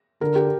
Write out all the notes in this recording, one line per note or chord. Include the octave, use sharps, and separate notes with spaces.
D3 A#4
G4